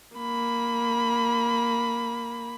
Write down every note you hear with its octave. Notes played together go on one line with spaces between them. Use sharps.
A#3 B5